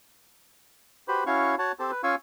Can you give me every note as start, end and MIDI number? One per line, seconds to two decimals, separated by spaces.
1.08 1.24 66
1.08 1.24 67
1.08 1.24 71
1.08 1.24 72
1.08 1.24 83
1.26 1.55 61
1.26 1.55 64
1.26 1.55 66
1.26 1.55 73
1.26 1.55 77
1.26 1.55 85
1.59 1.72 66
1.59 1.72 73
1.59 1.72 78
1.59 1.72 81
1.80 1.91 60
1.80 1.91 67
1.80 1.91 69
1.80 1.91 72
1.80 1.91 81
1.91 2.02 71
2.03 2.15 61
2.03 2.15 65
2.03 2.15 77
2.03 2.15 80
2.03 2.15 85
2.03 2.15 88